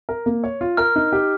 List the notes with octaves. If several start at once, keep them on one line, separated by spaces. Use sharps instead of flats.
A#4
A#3
C#5
F4
A#4 F6
D#4
G4